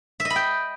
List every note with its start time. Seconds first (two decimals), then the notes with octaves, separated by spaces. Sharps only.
0.20 E5
0.25 D#5
0.30 B5
0.36 G5